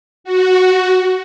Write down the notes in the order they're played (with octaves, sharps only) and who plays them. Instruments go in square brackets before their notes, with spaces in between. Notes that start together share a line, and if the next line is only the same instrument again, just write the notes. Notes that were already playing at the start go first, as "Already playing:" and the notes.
[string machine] F#4